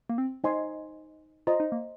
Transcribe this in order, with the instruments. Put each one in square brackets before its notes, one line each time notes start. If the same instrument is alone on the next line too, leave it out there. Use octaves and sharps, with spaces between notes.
[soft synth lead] A#3
C4
[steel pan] D#4 C5 D#5 G#5 C6
[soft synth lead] F4 [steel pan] C5 D#5 A#5
[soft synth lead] D#4
A#3